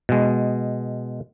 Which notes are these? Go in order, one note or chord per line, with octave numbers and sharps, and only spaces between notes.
B2 G#3